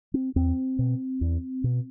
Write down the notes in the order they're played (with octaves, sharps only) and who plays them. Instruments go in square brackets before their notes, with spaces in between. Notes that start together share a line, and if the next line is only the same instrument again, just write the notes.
[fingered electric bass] C4
E2 C4
B2
E2
B2